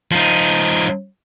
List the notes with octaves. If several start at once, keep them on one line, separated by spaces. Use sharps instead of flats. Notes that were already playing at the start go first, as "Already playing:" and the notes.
F3 D#4